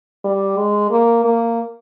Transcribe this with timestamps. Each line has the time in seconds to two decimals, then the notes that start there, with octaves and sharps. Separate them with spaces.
0.24 G3
0.57 G#3
0.91 A#3
1.25 A#3